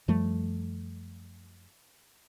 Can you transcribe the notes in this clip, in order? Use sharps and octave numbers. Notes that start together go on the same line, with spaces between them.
F#2 F3 G3 A3